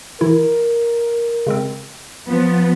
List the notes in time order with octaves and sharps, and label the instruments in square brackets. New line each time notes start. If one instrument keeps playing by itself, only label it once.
[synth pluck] E3 E4 [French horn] A#4
[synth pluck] C#3 G#3 C4
[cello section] F3 B3